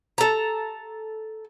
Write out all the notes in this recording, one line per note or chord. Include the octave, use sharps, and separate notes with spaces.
A4 A#5